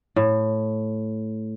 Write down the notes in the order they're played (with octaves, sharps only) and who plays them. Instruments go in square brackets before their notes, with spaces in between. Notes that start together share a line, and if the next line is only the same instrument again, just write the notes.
[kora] A2